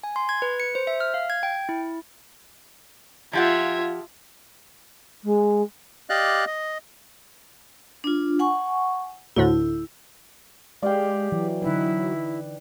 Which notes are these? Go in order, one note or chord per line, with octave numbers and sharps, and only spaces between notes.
G#5
C6
G#6
B4
C#7
C5
E5
F6
F5
G#6
G5
E4
F3 F4 G4 E5 F#5 G#6
G#3
G4 D5 D#5 F5 F#6
D#5
D4 F4
F#5 G#5 C#6
D2 A2 D3 E4
G#3 G4 D5 F5 G5
E3 F#3
D3 D#4 E4 B4